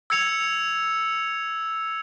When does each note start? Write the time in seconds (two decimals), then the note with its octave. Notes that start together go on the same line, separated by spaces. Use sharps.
0.10 E6 G#6 C#7 F7